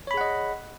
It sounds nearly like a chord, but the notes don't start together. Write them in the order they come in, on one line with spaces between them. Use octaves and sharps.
C#5 B5 G#4 F#5 D#5